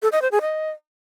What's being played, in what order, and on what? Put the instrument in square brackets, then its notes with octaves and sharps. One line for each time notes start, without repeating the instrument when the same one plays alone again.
[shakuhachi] A4
D#5
C5
G#4
D#5